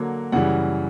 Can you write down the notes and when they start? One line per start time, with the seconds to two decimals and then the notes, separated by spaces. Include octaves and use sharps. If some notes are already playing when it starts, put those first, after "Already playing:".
Already playing: D3 F#3 A#3
0.32 F#2 C#3 E3 G3 F#5